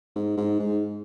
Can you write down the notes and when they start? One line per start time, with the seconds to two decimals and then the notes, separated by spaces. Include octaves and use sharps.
0.16 G#2
0.37 G#2
0.59 G#2